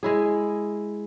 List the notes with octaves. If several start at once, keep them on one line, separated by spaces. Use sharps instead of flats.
G#3 E4 G#4